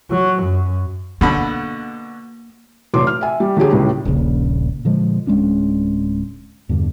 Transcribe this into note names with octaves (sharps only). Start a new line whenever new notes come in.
F#3
F#2
B2 D3 A#3 B5
F1 E3 F#3 C6 D6
F6
E5 G#5
G3
D3 F#3 G4 G#4
C#2 A2 G3 G#3
D#1 A#1 A#2 C#3
A#2 D3 F3 G#3
D1 G#3 C#4 D4
E2 G2 D3